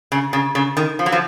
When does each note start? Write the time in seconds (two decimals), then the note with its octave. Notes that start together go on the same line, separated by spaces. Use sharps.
0.12 C#3
0.33 C#3
0.55 C#3
0.77 D#3
0.99 F3
1.06 F#3
1.12 F3